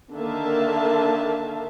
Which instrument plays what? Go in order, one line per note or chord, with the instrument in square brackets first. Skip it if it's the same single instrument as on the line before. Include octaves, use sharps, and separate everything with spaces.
[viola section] D3 D#3 A#3 E5 F5 A5